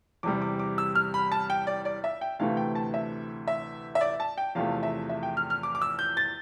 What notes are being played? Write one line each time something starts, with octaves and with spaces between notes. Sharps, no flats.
E2 C3 G3 D6
D6
D6
E6
F6
B5
A5
G5
D5
D5
E5
G5
D2 C3 E3 A3 F5
G5
A5
E5
E5
E5
D5
A5
G5
E2 C3 F3 A3 F5
E5
E5
G5
F6
F6
D6
D6
E6
G6
A6